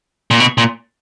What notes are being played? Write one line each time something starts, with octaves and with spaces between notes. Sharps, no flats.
A#2
B2
A#2